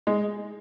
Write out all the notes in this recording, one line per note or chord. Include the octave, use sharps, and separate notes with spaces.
G#3